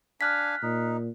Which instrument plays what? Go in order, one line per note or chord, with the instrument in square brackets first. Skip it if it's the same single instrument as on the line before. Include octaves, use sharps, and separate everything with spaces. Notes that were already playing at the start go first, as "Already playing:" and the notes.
[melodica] D4 F5 G#5 [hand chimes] F6 F#6 B6
[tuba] A#2 [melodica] D#4